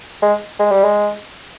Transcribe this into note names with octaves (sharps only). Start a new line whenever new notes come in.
G#3
G#3
G3
G#3